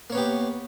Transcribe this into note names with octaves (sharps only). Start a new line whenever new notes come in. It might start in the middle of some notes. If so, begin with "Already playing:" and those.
A#3 B3 G4 C#5